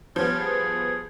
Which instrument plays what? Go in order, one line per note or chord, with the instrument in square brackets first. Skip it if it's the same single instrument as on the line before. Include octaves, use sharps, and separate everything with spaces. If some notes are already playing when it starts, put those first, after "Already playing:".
[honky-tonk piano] F3 G3 B3 [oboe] C#4
[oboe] G#4